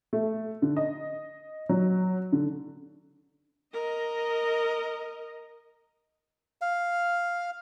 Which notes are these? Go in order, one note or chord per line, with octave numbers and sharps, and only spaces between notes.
A3
D3
D#5
F#3
D3
A#4 D#5
F5